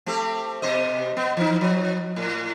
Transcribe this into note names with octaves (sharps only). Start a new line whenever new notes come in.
A3 C4 G4
B2 C5 D#5
B3
E3 D#4
F3
A2